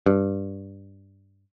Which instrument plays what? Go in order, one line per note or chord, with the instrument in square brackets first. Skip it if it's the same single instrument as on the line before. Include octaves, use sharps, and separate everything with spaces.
[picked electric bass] G2